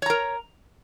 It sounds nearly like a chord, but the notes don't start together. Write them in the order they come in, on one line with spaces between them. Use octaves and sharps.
C#5 A#5 A#4